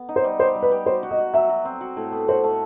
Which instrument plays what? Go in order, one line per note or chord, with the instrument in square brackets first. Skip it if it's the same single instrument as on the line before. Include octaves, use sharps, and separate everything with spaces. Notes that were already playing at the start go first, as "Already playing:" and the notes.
Already playing: [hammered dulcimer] B3
D#4
[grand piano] C5
[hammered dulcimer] G3
[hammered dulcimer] G4 [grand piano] C5
[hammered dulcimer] G3
[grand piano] B4
[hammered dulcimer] G4
[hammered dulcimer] F#4 [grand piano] C5
[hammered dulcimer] F#4
[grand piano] D#5
[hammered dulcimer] F#4
[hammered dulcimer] F#3 [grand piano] E5
[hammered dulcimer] F#4
C4
F#4
A2
B3
[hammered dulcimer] F#4 [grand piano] C5
[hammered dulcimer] A3